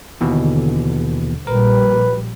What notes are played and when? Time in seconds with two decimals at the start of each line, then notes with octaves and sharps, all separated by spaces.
0.21 D#2 B2 D3 E3
1.47 A#1 A#2 G3 A#4 B4